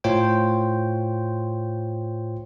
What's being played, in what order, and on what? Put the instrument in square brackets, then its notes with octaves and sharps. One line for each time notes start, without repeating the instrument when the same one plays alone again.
[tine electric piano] A2 F4 C5 C#5 G5